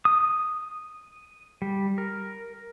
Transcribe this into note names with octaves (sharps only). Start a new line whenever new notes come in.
D#6
G3
A#4